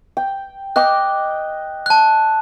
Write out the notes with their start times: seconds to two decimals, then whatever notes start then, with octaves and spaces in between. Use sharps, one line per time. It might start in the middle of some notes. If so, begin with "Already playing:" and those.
0.17 G5
0.76 D#5 G5 D6 F#6
1.86 A5 F#6